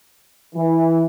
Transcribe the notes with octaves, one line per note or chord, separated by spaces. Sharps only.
E3